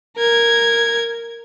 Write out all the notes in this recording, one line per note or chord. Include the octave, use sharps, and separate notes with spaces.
A#4 G#6